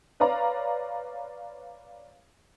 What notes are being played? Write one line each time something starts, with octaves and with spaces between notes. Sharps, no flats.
B4 C#5 D5 F5 A#5